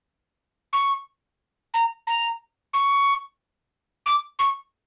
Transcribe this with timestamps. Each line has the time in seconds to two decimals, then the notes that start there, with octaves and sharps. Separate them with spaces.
0.72 C#6
1.73 A#5
2.06 A#5
2.73 C#6
4.05 D6
4.38 C#6